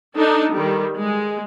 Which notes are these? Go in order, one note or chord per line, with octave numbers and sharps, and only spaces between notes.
D4 D#4 A4
D#3 G3
G#3